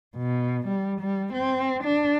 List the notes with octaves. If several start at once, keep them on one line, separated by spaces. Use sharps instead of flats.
B2
G3
G3
C4
D4